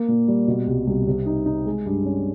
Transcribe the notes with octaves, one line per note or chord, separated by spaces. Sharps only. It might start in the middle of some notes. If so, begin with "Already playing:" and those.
Already playing: A#3
A#2
G3
B2
C2
C2
C3
D#4
D#4
G#3
G2
C#4